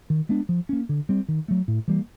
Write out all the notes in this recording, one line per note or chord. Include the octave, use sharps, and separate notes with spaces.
D#3
G#3 B3 D4
F3
A#3 C#4
D3
G3 C4
D#3
F#3 A3
A2
E3 G3 A#3